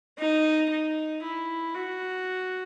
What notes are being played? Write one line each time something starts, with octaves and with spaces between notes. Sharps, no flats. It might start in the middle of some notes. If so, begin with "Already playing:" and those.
D#4
D#4
E4
F#4